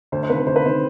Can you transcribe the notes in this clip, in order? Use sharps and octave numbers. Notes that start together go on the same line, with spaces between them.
D2 C5
C5
C3 D#3 B4
D2 C5
B4
C3 D#3 C5